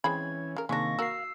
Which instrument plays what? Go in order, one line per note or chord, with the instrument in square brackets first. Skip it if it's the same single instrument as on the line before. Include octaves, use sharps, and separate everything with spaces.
[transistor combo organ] E3 C#4 [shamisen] G#3 C4 B5 [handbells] G#6
[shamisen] C#3 A#4
[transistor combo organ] C3 D#3 [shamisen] G#3 D4 [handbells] A#3 C#6 A#6
[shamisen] F#4 A#4 [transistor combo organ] F5 [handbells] E6 C7